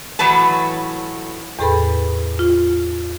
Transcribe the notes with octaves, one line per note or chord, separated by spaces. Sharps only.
A2 E3 F#3 B4 A5
E2 A2 G#4 A4 B4 B5
F4